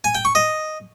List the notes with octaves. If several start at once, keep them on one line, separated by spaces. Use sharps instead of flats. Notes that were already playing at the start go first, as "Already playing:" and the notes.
G#5
G5
C#6
D#5